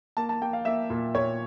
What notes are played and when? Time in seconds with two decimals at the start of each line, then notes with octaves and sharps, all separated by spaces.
0.17 A#3 A5
0.29 A5
0.42 A#3 G5
0.53 F5
0.65 A#3 E5
0.90 A#2
1.15 A#2 C#5